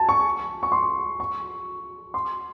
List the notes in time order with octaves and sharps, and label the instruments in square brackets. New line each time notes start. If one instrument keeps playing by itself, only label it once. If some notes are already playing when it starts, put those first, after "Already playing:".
Already playing: [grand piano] G#5 A5
C#6
C#6
C6
C#6
C6